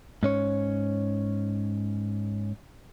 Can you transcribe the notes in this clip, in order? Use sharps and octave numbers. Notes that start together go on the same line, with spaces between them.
G#2 C#4 C#5